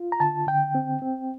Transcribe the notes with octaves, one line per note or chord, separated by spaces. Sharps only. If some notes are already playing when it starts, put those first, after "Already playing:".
Already playing: F4
A#5
D3 A5
D3 G5
C4
C4